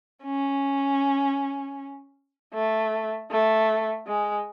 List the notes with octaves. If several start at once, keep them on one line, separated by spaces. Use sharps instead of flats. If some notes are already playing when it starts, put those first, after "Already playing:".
C#4
A3
A3
G#3